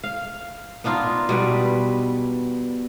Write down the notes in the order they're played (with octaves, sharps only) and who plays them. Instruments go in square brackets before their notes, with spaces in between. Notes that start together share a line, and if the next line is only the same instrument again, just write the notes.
[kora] F5
B3 D4 D#4 F4
B2 G3 B4